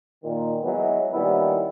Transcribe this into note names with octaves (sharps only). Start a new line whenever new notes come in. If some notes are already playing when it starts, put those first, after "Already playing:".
A#2 D#3
E3 F#3 G#3 B3
A#2 D#3 G3 B3 C#4 E4